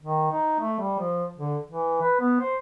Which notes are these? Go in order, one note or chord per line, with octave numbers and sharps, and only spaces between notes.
D#3
D#4
A3
G3
F3
D3
E3
B4
B3
C5